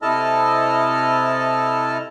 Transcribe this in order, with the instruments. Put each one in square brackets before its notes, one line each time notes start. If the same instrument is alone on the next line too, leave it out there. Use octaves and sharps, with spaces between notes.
[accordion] C3 E4 A4 D#5 A5 F6